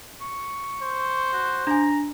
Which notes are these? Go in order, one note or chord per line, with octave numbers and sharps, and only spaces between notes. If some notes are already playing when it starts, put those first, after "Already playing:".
C#6
C5
F#4
D4 G#5 A#5